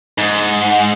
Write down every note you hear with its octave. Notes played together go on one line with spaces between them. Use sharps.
G#2